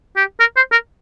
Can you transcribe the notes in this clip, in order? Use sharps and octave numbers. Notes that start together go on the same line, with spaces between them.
G4
A#4
C5
A#4